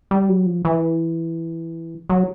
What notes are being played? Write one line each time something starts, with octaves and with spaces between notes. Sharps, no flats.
G3
F#3
F3
E3
F#3